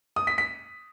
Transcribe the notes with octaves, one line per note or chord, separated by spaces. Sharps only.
D#6
B6
B6